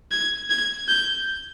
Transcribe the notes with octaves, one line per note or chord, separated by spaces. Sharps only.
G#6
G#6
G6